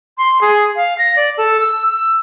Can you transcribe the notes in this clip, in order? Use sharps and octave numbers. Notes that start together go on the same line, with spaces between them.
C6
G#4
F5
A#6
D5
A4
E6
E6